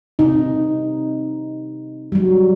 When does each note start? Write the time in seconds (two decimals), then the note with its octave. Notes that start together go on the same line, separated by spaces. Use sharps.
0.19 C3 D#4
2.12 F#3 G3